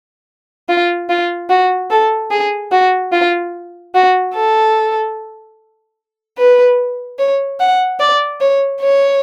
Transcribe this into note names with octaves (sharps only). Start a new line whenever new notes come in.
F4
F4
F#4
A4
G#4
F#4
F4
F#4
A4
B4
C#5
F#5
D5
C#5
C#5